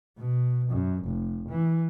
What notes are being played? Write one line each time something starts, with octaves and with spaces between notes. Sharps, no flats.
B2
F#2
F1
E3